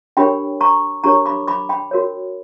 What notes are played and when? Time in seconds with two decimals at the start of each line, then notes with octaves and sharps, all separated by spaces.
0.17 D4 G4 A#4 C#5 G5 B5
0.61 A#5 C#6
1.04 D4 G4 A#4 C#5 A#5 C#6
1.26 B5 D6
1.47 B5 D6
1.69 G5 B5
1.91 F#4 A#4 C#5